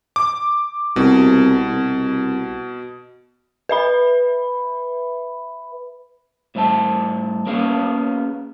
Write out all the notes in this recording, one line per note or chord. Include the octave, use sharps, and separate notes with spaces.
D6
C2 B2
C2
B4 E5 B5
A2 G3 C5 E5 A5
A#3 B3 C#4 G#4 F5